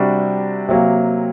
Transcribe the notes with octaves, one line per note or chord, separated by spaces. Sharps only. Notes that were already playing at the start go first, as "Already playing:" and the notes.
Already playing: C3 G3 D4 F#4
C3 F#3 A#3